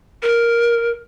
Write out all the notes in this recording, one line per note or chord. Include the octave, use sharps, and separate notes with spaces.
A#4